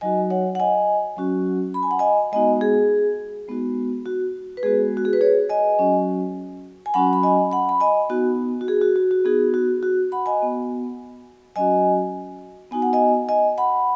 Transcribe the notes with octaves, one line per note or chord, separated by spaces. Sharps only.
F#3 D#4 F#4 D#5 G#5
C#5 F#5
F#5
D#5 G#5
F#3 C#4 F#4
B5
G#5
F#5
D#5 G#5
G#3 B3 D#4 F#4 D#5 G#5
G#4
G#3 B3 D#4 F#4
F#4
B4
G#3 B3 F#4 G#4
F#4
G#4
B4
G#4 C#5
D#5 G#5
F#3 C#4 F#4
G#5
F#3 C#4 F#4 F#5 B5
B5
D#5 G#5
F#5 B5
B5
D#5 G#5
B3 D#4 F#4
F#4
G#4
F#4
F#4
F#4
B3 D#4 F#4 G#4
F#4
F#4
F#5 B5
D#5 G#5
B3 F#4
F#3 C#4 F#4 D#5 G#5
B3 D#4 F#4 G#5
F#5
D#5 G#5
D#5 G#5
F#5 B5